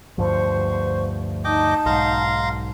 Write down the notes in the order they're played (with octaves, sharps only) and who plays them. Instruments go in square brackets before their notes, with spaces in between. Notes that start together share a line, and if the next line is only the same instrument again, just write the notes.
[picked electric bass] D2 G2 F3 [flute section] C5 C#6
[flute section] D#4 A5 [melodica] D#5 G5 D6
[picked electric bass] B1 G#2 [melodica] F5 A#5 C6